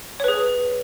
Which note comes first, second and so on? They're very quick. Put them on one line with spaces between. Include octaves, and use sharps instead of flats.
C#5 B4 G#4